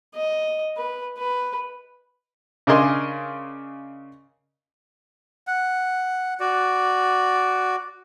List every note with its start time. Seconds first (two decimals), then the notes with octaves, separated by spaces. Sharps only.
0.15 D#5
0.77 B4
1.17 B4
2.67 C#3 D4 A#4 D#5 G#5 C6
5.47 F#5
6.40 F#4 D5